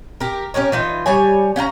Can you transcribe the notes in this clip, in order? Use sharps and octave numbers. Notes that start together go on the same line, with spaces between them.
G4 A#4
C#4 G4 A#4 C#5
E3 D#4 F4
G3 C#5 G#5
C#4 F5 G5 A#5